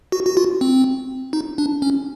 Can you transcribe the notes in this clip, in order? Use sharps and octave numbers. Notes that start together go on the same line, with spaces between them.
F#4
F#4
F4
C4
D#4
D4
C#4